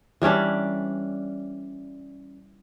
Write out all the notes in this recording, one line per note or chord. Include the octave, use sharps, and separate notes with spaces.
E3 G3 C#4 D4